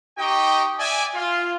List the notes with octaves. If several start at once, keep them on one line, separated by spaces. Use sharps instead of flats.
D#4 G4 D#5 G5 C#6
D5 E5 G#5
F4